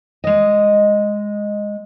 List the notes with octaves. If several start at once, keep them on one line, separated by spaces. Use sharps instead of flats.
G#3 D#5